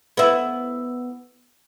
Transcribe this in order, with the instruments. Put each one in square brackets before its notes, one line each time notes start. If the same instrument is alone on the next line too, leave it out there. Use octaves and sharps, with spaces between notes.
[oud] B3 E4